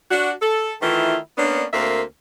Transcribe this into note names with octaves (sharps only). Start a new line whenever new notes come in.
D4 F#4
A4
D#3 E3 A3 E4 F4
A#3 B3 C#4 D4
D2 A#3 C4 A#4 E5